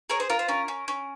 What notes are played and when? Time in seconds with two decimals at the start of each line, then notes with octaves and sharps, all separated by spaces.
0.10 G#4 A#4 C#5
0.20 C5
0.30 F4 A#4
0.39 C5
0.48 C#4 A#4
0.68 C#4
0.88 C#4